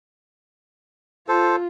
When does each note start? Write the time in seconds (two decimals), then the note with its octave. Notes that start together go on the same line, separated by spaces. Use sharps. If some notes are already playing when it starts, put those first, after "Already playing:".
1.28 F4 A4 C5